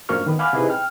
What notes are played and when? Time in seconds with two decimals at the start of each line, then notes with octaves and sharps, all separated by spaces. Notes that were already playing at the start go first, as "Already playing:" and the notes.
0.09 F#2 F3 A#3 D4 C#6 F6
0.26 D#3 B3 B4
0.39 F5 F#5 G#5 B5 D6 F6
0.53 C3 D#4 E4 G#4 B4 D#5
0.70 G5 F6